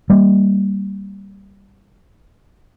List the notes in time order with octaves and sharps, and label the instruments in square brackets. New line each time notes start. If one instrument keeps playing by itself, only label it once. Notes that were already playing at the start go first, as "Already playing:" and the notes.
[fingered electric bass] G3 A#3